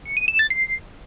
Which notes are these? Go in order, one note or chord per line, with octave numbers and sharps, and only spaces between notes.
C#7
D#7
E7
A6
C7